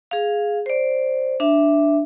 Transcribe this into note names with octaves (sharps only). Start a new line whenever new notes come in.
G#4 F5
C5 D5
D4 E5